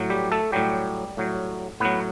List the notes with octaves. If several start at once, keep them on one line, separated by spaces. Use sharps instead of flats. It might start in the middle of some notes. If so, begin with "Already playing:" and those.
Already playing: A2 F#3
G3 G4
A3 A4
A2 F#3 G3 G4
A2 F#3
A2 F#3 B3 B4